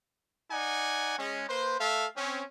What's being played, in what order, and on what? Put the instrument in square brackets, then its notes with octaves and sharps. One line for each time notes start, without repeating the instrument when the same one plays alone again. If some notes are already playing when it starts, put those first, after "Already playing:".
[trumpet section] D#4 D5 F#5 G#5
G#3 C#4
A#3 B4 C5
A3 A4 E5 F5
C4 C#4